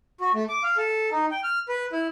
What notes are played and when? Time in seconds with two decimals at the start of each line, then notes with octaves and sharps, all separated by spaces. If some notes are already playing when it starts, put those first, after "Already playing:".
0.20 F#4
0.34 A3
0.49 D6
0.63 F5
0.77 A4
1.12 D#4
1.31 G5
1.43 F6
1.68 B4
1.92 E4